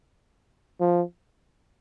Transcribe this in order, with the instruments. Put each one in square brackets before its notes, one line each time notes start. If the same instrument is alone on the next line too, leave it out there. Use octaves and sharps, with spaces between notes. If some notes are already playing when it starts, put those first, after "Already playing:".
[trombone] F3